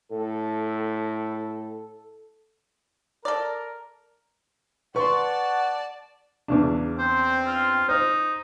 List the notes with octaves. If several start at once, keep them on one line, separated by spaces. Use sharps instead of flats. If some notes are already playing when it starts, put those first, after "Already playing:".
A2 A4
A4 A#4 D5
B4 D5 F#5 A5 C6 C#6
E2 C#3 D4
C4 C5
F4
D#4 C5